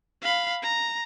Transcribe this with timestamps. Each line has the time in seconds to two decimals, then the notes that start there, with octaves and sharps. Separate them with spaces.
0.22 F5 B5
0.63 A#5